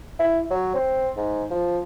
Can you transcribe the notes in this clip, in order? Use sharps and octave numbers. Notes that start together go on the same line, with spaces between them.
E4
F#3
C4
G#2
F3